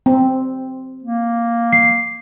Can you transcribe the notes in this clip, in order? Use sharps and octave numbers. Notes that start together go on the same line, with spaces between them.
C4
A#3
C7